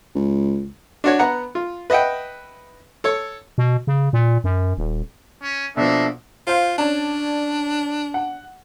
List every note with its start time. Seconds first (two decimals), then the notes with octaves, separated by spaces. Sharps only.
0.15 C#2
1.04 D4 F#4 C#5
1.19 B3 F#5 A#5
1.55 F4
1.90 B4 D#5 E5 F#5 G5
3.04 A4 C#5
3.58 B2
3.87 C#3
4.13 A#2
4.44 F#2
4.77 D#1
5.42 C#4
5.77 B2 F3 A#3 D4 A4 E5
6.47 F4 C5 F5
6.78 C#4 D4 D5 A5
8.14 F#5